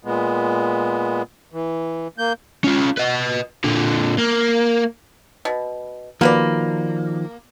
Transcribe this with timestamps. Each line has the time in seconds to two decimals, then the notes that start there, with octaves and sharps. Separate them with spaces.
0.05 A#2 G#3 B3
1.53 E3
2.18 A#3 G6
2.64 C#4 F4
2.98 B4 D#5
3.64 A#2 D3
4.18 A#3
5.45 B2
6.21 D#3 F3 A#3 F#4 B4 D5